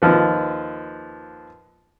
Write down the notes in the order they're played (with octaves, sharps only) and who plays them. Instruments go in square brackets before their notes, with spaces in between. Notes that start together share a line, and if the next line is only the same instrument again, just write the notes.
[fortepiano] D#2 F3 B4